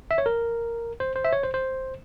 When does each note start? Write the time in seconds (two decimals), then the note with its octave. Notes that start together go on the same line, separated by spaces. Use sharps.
0.11 E5
0.18 C#5
0.26 A#4
1.00 C5
1.16 C5
1.24 E5
1.33 C#5
1.43 C5
1.54 C5